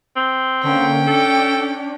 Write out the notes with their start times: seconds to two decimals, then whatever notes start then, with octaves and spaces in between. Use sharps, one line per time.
0.16 C4
0.63 D3 A#3 C#4 G5
1.07 D4 A4